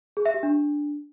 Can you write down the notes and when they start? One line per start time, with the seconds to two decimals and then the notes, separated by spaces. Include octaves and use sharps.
0.17 G#4
0.26 E5
0.34 G4
0.43 D4